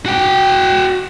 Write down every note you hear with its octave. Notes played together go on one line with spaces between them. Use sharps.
F#4 G5